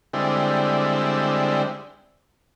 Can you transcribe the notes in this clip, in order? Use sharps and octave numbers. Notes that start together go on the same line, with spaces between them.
D3 G3 G#3 C4 E4